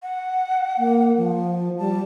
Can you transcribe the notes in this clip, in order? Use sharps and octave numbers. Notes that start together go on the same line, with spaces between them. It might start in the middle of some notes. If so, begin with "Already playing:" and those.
F#5
A#3
F3
G3 A5